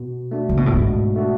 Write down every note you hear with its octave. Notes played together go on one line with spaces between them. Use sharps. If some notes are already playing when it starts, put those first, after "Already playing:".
Already playing: B2
A3 D4 F#4
C#3
B2
A2
G#2 B2
A3 D4 F#4